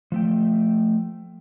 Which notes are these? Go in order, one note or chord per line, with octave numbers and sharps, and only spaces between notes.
F3 A3 G5